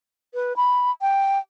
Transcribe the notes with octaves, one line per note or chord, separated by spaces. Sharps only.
B4
B5
G5